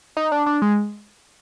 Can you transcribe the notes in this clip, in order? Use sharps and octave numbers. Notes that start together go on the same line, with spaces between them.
D#4
D4
D4
G#3